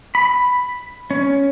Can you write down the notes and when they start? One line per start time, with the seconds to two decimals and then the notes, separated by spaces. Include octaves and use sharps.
0.15 B5
1.11 C#4